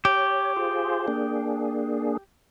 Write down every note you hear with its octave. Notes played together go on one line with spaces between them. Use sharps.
G4 C#5
F4 G#4 C5
A#3 D4 G#4